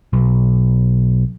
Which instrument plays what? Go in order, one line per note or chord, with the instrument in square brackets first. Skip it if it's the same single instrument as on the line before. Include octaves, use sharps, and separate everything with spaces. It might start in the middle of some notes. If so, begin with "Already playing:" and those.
[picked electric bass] B1